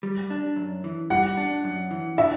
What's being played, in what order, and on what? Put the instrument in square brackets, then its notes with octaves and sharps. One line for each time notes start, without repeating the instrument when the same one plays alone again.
[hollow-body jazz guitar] G3
D4
F#2
E3
[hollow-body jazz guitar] G3 [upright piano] F#5
[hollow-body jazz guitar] D4
F#2
E3
[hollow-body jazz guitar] D4 [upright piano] E5